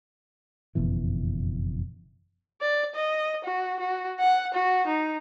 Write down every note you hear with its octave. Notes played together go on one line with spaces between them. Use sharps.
F#1 F2 B2 E3
D5
D#5
F#4
F#4
F#5
F#4
D#4